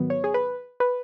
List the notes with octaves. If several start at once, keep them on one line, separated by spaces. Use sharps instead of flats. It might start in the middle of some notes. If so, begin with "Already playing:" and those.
Already playing: G#2 D#3 F#3 B3
C#5
G#4
B4
B4